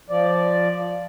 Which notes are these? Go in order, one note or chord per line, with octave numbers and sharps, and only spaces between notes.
F3 D5